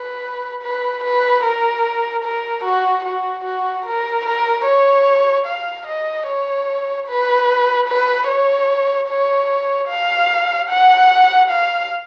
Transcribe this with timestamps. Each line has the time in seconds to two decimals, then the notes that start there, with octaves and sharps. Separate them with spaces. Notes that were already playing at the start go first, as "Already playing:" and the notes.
Already playing: B4
0.63 B4
1.04 B4
1.44 A#4
2.24 A#4
2.64 F#4
3.05 F#4
3.45 F#4
3.86 A#4
4.25 A#4
4.66 C#5
5.46 F5
5.87 D#5
6.27 C#5
7.08 B4
7.88 B4
8.28 C#5
9.09 C#5
9.89 F5
10.70 F#5
11.50 F5